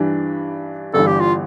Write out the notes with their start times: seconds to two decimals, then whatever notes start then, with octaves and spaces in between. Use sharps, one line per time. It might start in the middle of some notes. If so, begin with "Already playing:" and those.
Already playing: G2 E3 G3 D4
0.94 G1 G2 E3 A4
1.07 G4
1.20 F4